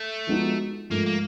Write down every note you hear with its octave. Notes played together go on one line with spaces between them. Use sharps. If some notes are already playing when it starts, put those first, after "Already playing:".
Already playing: A3
F3 G#3 B3 D#4 F#4
G#2 F3 A3 A#3
A#3